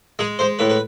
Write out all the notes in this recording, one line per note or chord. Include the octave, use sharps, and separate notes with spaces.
G#3 G#4
G#3 C5
A2 B4
B4